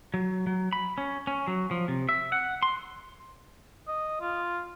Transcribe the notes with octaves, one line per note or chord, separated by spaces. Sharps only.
F#3
F#3
B5
C#4
C#4
F#3
F3
C3
E5
F#5
C6
D#5
F4